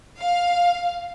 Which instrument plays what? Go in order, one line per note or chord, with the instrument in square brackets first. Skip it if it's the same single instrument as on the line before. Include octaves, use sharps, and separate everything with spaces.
[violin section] F5